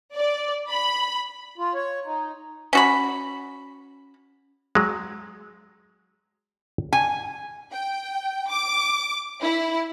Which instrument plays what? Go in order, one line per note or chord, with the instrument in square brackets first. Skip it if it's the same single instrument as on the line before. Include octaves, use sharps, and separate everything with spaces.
[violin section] D5
B5
[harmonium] F4
C#5
D#4
[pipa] C#4 F#4 B5
[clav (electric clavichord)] F#3 G#3
[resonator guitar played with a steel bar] G#5
[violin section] G5
D6
E4